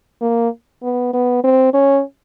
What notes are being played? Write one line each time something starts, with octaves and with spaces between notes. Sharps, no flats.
A#3
B3
B3
C4
C#4